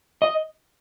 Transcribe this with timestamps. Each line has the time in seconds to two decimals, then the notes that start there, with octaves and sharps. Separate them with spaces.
0.22 D#5